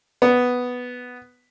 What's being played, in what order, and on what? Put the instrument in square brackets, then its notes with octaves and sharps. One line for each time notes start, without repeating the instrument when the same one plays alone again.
[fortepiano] B3